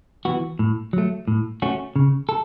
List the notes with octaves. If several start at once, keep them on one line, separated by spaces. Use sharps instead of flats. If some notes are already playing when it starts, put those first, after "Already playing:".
E3 B3 F#4
A2
F#3 A3
A2
A3 C#4 F#4
C#3
A4